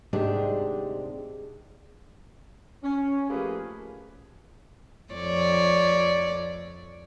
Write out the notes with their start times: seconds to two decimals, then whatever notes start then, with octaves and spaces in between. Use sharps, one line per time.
0.13 D2 G#2 C3 G#3 D4 G4
2.82 C#4
3.30 F3 A3 A#3 G4 G#4 B4
5.13 F2 C#5 D5